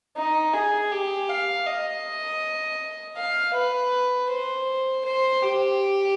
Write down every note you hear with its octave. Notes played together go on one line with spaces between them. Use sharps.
D#4
G#4
G4
F5
D#5
F5
B4
C5
C5
G4